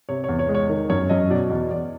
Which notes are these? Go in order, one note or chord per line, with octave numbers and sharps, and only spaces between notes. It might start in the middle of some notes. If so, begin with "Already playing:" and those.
C3 C#5
E2 C#5
C#5
G#3
C#5
D#3
F#2 C#5
F#2 D#5
B2 D5
E2 D#5
E2 D5